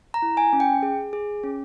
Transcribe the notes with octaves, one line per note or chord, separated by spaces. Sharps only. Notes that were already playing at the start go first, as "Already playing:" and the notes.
A#5
E4
G#5
C#4
G5
G#4
G#4
C#4